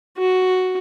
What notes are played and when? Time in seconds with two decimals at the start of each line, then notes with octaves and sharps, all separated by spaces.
0.18 F#4